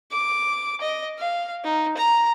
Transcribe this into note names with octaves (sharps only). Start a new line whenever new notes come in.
D6
D#5
F5
D#4
A#5